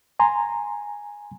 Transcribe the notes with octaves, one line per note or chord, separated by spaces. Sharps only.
G#5 A#5 C6